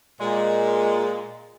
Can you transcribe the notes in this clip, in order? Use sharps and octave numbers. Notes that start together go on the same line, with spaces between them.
A#2 G#3